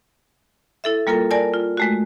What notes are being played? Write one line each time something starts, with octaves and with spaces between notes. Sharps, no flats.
E4 A4 E5
G3 A#3 F4 A4 A#4
A#4 D5 G#5 A5
F4
G#3 A3 F#4